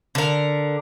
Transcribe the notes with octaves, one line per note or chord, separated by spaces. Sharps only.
D3 A#4